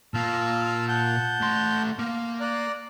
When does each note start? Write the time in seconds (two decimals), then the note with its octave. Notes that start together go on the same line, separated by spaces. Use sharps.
0.14 A#2 F4 A5 E6 F6
0.88 F#5 A5 G6
1.41 A2 C6
1.99 A#3 F6
2.40 D5 A#5 F#6